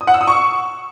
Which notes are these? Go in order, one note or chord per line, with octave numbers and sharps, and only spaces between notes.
D#6
F#5
E6
D#6
C#6